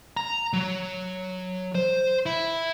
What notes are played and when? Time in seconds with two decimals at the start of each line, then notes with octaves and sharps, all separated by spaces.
0.17 A#5
0.53 F#3
1.75 C5
2.26 E4